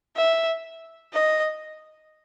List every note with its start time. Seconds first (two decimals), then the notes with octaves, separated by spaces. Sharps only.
0.16 E5
1.13 D#5